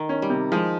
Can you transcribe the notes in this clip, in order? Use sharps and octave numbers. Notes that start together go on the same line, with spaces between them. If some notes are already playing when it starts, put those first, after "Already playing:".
Already playing: D#3
C#4
G3
C3
F3 G#3